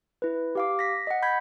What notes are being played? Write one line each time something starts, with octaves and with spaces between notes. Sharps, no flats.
E4 B4
G4 F5 D6
A#6 B6
D#5 F#5
B5 G6 G#6 B6